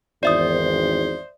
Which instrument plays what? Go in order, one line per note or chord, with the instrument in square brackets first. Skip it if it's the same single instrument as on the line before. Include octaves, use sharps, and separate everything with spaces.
[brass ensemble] G#1 E2 [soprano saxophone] C5 [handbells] D5 E5 D#6